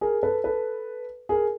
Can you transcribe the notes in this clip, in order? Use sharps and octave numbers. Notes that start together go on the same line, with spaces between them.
G#4 A#4
A4 B4
A4 B4
G#4 A#4